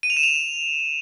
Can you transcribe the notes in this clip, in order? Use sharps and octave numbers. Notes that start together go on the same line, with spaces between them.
D#7
F7
E7
F7